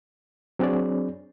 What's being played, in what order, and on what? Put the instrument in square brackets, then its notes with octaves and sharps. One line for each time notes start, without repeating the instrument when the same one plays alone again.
[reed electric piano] F#3 C4 D4 G#4 C#5 D5